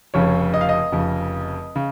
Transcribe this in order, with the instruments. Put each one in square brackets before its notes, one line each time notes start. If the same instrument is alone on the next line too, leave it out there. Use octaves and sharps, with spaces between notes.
[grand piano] F1 F2 C#3 C#5
D#5
F5
D#5
F1 F2 C#3
C#3